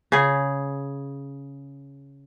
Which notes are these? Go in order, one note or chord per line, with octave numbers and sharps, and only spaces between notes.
C#3 G#4